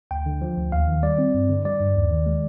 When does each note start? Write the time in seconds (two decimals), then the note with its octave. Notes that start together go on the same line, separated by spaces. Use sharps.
0.11 D2 G5
0.26 D3
0.41 F3
0.57 D2
0.72 D#2 F5
0.88 D#3
1.03 G3 D5
1.18 C4
1.34 G2
1.49 D3
1.65 G3 D5
1.80 G2
1.96 D#2
2.11 D#3
2.26 G#3